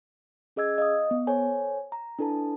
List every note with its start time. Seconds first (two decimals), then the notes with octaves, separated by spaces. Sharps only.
0.56 C#4 G#4 D#5 E6 G#6
0.78 D#5 F5 D#6
1.11 B3
1.27 A4 C5 C#5 G#5
1.92 A#5
2.19 D4 E4 A4 B4 A5